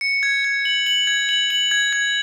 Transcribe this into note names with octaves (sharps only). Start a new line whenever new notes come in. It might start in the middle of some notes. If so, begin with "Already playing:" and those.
C#7
G#6
G#6
F#7
F#7
G#6
F#7
F#7
G#6
G#6